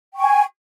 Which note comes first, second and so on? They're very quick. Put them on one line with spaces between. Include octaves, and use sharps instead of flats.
G5 C#6 G#5